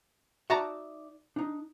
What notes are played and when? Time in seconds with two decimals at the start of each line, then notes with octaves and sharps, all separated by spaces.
0.50 D#4 F#4 D5 E5 A5 A#5
1.36 D4 D#4